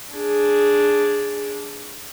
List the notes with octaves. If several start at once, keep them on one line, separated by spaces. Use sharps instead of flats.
D4 G#4